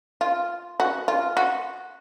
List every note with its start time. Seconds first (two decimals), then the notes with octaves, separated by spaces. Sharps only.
0.21 F4
0.80 F#4
1.08 F4
1.37 F#4